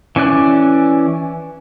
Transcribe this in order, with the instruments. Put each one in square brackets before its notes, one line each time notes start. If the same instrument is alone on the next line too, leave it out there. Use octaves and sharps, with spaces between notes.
[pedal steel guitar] E3 C#4 D5 F#6